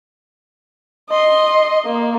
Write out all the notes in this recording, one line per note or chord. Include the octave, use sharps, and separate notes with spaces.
D#5 C6
A#3